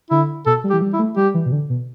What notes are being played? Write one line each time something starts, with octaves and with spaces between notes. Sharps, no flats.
D3 E4
B2 A4
G3
G4
E3
G3
E4
A3
G3 G4
E3
B2
D3
B2